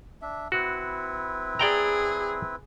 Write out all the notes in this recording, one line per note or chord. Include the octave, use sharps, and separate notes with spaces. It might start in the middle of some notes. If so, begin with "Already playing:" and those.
D4 E5
C4 E4 F#4 B4
G#4 D5 G5 A#5